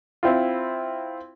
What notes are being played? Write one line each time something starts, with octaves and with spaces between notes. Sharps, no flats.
C4 E4 F4